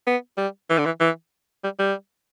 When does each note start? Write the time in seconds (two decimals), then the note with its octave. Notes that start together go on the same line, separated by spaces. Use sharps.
0.07 B3
0.38 G3
0.70 E3
0.78 D3
0.85 E3
1.00 E3
1.64 G3
1.79 G3